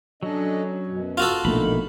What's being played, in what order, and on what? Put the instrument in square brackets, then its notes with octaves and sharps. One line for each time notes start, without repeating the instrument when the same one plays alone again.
[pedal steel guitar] F#3 C#4 [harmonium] D4 A4 D#5
[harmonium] F#2 B2
[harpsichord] F4 F#4 A4
[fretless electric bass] A#1 B2 A3 [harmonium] D3 A#3 D#4 [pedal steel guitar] B5